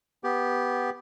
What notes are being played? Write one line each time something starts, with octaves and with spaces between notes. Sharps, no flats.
B3 G4